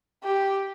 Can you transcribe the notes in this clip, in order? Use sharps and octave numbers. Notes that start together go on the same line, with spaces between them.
G4